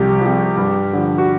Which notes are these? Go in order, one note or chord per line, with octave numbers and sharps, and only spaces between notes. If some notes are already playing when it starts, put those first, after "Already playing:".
Already playing: C2 C3 F3 G4
C3 F3
G2
D3 F3
F#4